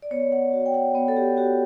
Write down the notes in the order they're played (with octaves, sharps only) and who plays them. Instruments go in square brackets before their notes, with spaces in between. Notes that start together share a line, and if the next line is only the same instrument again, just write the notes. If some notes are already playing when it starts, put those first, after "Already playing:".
[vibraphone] D5
B3 C#5
F#5
F#4
G5
F#5
B3 C#5
A4
G4
F#4 G4